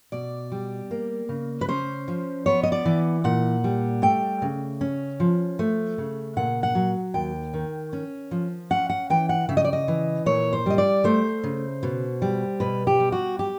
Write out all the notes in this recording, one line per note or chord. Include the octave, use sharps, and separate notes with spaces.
B2 D5
G3
A#3
C#3
B4
C#4 C5
F3
B3 C#5
D#5
D5
E3
A#2 F#5
G3
A3 G5
C#3
C#4
F3
A3
C#3
A#2 F#5
F#5
F#3
D#2 G5
D#3
C#4
F3
C#4 F#5
F#5
E3 G5
F#5
C#3 E5
D#5
D5
D#5
E3
A#2 C#5
C5
G3 D#5
D5
A3 C5
C#3
B2
G3
B2 B4
G4
G3
F#4
G4